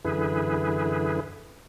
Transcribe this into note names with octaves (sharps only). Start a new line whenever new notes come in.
F#2 D3 E3 E4 G#4 B4